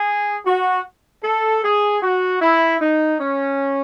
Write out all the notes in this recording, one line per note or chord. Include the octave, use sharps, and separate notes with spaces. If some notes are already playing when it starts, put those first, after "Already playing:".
Already playing: G#4
F#4
A4
G#4
F#4
E4
D#4
C#4